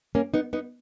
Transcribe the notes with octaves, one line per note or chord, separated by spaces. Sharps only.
A#3 C#4
B3 D#4
B3 D#4